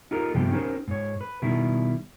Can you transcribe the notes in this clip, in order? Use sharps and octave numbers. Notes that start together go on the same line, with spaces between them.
D#4 F4 G4 A4 A#4
G2 C3 F3 A3 B3 G4
C#4 D#4 G4 G#4 A#4 C5
G#2 C#5
B4
B2 D#3 G3 E4